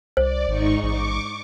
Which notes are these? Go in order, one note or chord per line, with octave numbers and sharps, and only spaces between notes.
C2 C5 D5
G#1 G#2 D#4 C#6
A1 C#6 D6